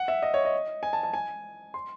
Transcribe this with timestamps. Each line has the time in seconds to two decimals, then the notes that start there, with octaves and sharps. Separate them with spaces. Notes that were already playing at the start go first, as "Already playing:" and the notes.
Already playing: F#5
0.08 E5
0.22 D#5
0.34 C#5
0.45 D#5
0.83 G#5
0.93 A5
1.03 A5
1.14 G#5
1.74 C6